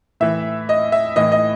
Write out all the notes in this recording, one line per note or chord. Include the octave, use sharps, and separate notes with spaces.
A2 E3 E5
D#5
E5
A2 E3 D#5
D#5